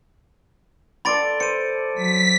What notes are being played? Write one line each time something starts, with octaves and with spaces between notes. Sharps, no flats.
A4 D5 B5 C6 A6 D7
C5 C#7 D#7
F#3 B6